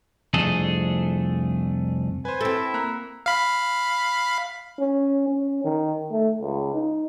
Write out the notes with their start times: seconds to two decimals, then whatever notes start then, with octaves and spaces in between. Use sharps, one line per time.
0.34 C2 F2 A3 D4 G#4 A4
2.25 B4 C5 G#5
2.41 C4 E4 A4
2.74 A#3 A#5 F#6
3.26 F5 B5
4.79 C#4
5.28 C#4
5.64 D#3
6.12 A3
6.40 C#2
6.74 D#4